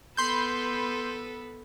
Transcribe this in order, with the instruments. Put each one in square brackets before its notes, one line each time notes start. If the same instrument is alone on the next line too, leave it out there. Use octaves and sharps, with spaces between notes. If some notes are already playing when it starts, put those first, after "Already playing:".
[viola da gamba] B3 A4 B4 [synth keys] B5 C6 G6